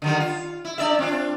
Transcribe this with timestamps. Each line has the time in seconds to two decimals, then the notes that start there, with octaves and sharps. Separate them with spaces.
0.02 D3 D#3 G3
0.20 F4
0.65 E4
0.78 D4 D5 E5
0.99 C4 D4 F4